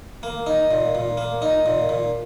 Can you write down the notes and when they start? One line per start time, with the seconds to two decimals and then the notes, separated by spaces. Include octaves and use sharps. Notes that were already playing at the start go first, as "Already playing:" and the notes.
0.23 A#3
0.47 D#4
0.71 A#2
0.95 A#2
1.17 A#3
1.42 D#4
1.66 A#2
1.89 A#2